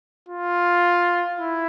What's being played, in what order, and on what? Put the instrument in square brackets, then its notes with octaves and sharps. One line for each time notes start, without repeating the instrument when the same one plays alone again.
[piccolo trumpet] F4
E4